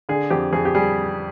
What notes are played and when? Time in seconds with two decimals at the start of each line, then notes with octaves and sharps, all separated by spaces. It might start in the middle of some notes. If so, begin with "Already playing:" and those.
0.09 D3 G#4
0.30 F2 G4
0.53 F2 G#4
0.65 G4
0.75 G3 G#4